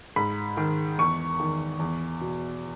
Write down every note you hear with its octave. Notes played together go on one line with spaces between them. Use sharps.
G#2 B5
D#3
E2 C#6
D#3
E2
B2